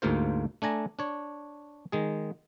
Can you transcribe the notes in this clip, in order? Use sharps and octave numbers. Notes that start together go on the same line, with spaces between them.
D2 G#2 A#3 F4 C5
A3 D4 G#5 A#5
D4 C#5
D#3 G#3 G#4